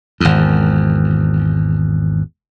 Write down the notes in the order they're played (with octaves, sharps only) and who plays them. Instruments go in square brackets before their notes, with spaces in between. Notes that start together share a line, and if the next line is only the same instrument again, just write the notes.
[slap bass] G#1 E2